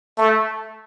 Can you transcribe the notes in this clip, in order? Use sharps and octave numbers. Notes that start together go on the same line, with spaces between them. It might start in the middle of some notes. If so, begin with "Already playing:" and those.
A3